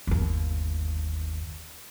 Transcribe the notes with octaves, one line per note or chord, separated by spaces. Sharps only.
G1 D#2